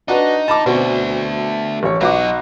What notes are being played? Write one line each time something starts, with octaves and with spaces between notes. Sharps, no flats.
D4 D#4 F#4 B4
A5 B5 D6
B2 A3 C4 D4
A1 C#5
B1 F#3 F#4 D#5 D6